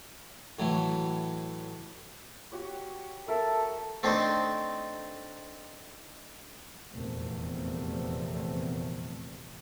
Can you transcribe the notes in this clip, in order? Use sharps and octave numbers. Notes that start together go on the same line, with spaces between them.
A2 E3 F#3 A3
F#4 G4 C#5
A4 A#4 E5
A3 C4 D4 D#4 C5
F1 E2 A#2 G3 A3 C4